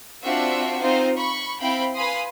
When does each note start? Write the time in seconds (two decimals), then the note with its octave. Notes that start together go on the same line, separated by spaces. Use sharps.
0.24 C4 D4 F4 F#4 C5 E5
0.78 C4 D#4 F4 C5
1.17 B5 C#6
1.59 C4 E4 F5 G5 B5
1.95 B4 F5 G#5 B5 C6 D#6